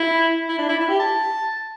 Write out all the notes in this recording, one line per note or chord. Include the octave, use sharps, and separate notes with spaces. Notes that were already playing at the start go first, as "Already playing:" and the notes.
Already playing: E4
E4
D4
E4
E4
G4
A5